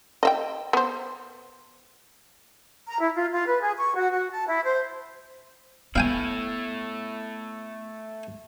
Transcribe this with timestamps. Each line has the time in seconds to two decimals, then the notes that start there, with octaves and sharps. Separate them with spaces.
0.23 D#5 E5 G5
0.73 B3 C5
2.86 A#5
2.99 E4
3.14 F4
3.31 F4
3.46 B4
3.61 G#4
3.77 C#6
3.95 F#4
4.12 F#4
4.30 A5
4.48 E4
4.64 C5
5.96 A3 B3 E4 F5 G5 G#5